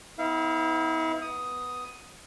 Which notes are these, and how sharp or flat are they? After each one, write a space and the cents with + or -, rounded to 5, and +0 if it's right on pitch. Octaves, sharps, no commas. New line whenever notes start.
B3 +20 E4 -40 F5 -30
B3 +0 D#6 +5